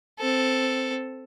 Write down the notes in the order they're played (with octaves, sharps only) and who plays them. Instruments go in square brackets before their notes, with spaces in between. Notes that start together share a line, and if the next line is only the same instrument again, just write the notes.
[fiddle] C4 A4